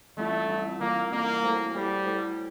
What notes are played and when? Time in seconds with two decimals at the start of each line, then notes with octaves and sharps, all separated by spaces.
0.17 E3 G3 A3 C4 F4
0.49 E3 G3 C4 F4
0.80 E3 G3 A#3 C4 F4
1.12 E3 G3 A#3 C4 F4
1.43 A3 E4 A4 C5
1.75 G3 A3 E4 A4 C5
2.06 A3 E4 A4 C5